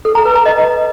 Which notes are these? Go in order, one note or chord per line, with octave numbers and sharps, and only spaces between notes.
A4
A#5
B4
A#5
D#5